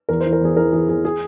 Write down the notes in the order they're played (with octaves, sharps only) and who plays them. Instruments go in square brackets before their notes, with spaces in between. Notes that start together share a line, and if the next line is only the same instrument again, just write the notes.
[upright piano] E2 A#4
E3 C5
A#4
E2 G#4
E3 A#4
E3 G#4
E2 G#4
G#4